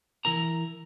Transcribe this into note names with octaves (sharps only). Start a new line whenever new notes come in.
E3 E4 A#4 A#5